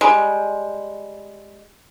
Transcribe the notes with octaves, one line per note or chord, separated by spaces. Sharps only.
G3 G#3